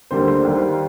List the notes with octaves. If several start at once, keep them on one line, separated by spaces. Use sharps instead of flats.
D2 D3 G3 A#3 C5
C5
D#2 D#3 G3 C5